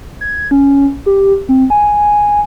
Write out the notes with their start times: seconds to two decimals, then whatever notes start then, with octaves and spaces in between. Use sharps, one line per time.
0.21 G#6
0.51 C#4
1.06 G4
1.49 C4
1.70 G#5